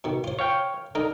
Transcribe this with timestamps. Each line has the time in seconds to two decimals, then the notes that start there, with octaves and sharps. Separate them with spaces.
0.04 B2 D#3
0.24 F4 C5
0.39 C#5 F5 G5
0.95 D3 D#4 A#4